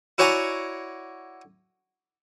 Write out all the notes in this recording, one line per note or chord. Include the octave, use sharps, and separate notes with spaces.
E4 F#4 C#5 D5 G#5 A#5